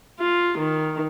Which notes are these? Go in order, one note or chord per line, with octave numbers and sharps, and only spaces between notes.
F4
D#3